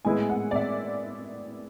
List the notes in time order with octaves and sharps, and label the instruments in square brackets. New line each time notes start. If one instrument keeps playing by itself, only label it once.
[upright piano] A2 G#3 B3 E4 [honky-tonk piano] G#5
[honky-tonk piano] F#5
D5
E5